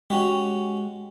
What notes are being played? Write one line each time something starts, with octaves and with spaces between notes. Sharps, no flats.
G#3 C#4 F#4 G4